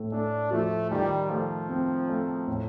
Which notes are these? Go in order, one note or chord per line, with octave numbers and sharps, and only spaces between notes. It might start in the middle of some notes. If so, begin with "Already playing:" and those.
Already playing: A2 A3
A3 D4
F3 A3
D#3 G3
F3 A3
C4
A3
A2